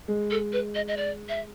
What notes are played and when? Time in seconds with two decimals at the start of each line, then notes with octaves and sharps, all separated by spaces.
0.08 G#3
0.31 A4
0.52 B4
0.75 D#5
0.88 D#5
0.97 D5
1.29 E5